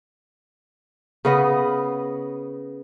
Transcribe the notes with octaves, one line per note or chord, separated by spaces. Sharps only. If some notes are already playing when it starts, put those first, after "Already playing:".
C#3 B3 D#5